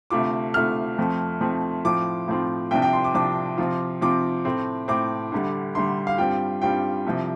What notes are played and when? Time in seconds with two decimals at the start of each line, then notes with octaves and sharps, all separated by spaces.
0.10 D2 C3 A3 F4 D6
0.54 D2 C3 A3 F4 F6
0.98 F2 F3 A3 C4
1.41 F2 F3 A3 C4
1.85 A2 F3 C4 F4 D6
2.28 A2 F3 C4 F4
2.71 C2 C3 F3 D4 G5
2.82 G5
2.93 C6
3.04 D6
3.14 C2 C3 F3 D4 D6
3.58 C3 F3 C4 F4
4.01 C3 F3 C4 F4 D6
4.45 A2 A3 C4
4.88 A2 A3 C4 D6
5.32 D2 D3 G3
5.75 D2 D3 G3 C6
6.07 F5
6.18 G2 G3 C4 F4 G5
6.62 G2 G3 C4 F4 G5
7.06 C2 C3 F3